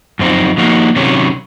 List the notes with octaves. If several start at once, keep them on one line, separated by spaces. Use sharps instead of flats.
F#2 F3 C4 D#4
F3 A#3 D#4 F#4
C3 D#3 F#3 C#4